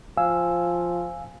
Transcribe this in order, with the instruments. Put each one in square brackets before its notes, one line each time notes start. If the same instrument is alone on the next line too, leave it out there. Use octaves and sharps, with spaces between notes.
[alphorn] F3 [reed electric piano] F5 G#5 E6